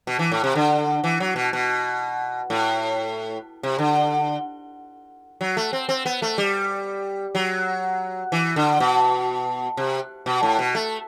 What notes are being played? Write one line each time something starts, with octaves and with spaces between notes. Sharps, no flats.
B2
E3
A2
C3
D3
E3
F#3
B2
B2
A2
C3
D3
F#3
A3
C4
C4
B3
A3
G3
F#3
E3
D3
B2
C3
B2
A2
B2
A3